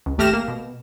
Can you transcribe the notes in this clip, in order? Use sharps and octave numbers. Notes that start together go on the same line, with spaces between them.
C#2
G#1 A3 G4 F6 A#6 E7
A#3
B2